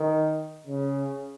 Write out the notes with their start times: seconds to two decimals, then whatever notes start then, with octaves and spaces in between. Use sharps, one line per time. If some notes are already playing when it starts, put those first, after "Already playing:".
Already playing: D#3
0.67 C#3